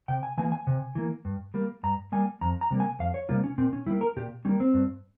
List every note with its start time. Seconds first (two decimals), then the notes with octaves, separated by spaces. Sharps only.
0.08 C3 G5
0.23 G#5
0.38 E3 A#3 G#5
0.52 G#5
0.67 C3
0.95 E3 A#3
1.25 G2
1.54 G3 A#3
1.83 G2 A#5
2.12 G3 A#3 G#5
2.41 F2 A#5
2.61 A#5
2.71 C3 G3 A#3
2.80 G#5
2.99 F2 F5
3.14 C#5
3.29 C3 G3 A#3 F4
3.44 C#4
3.58 A#2 C4
3.73 C#4
3.87 G3 E4
3.91 A#3
4.01 A#4
4.17 A#2 G4
4.45 G3 A#3 C#4
4.60 C4
4.74 G2